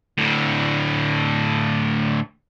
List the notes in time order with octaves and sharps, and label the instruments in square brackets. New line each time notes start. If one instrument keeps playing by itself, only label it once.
[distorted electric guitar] D2 A2